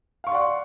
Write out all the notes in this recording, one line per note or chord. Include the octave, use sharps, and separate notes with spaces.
D5 F5 F#5 C6 C#6